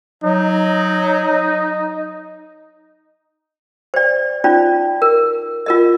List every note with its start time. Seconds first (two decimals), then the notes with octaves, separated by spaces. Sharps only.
0.24 F#3 D#4
3.94 C5 D5
4.44 C#4 D#4 F4 D5
5.02 A#4
5.66 F4 A#4 D#5